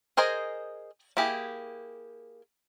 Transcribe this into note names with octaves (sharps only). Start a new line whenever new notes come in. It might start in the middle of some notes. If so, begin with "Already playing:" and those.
G#4 A#4 C5 D#5 G#5
A#3 E4 G4 G#4